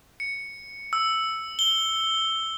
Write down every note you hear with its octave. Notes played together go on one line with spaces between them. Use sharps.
C#7
E6
G7